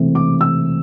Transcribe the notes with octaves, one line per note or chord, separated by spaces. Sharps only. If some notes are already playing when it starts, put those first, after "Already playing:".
Already playing: E1 E2 C3 A3 C4
D6
E6